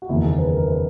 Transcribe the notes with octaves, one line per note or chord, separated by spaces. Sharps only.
F#4
F#1 E2 D#3 E4
G#4
B4
A#4
B4